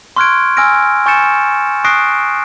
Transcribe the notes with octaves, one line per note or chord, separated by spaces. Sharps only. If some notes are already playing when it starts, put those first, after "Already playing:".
C6 C#6 F6 F#6 G#6 D7
G#5 E6 F6 A#6 D7
G#5 C#6 G6 A6 C#7 E7
C#6 D#6 F#6 A#6 C7 D7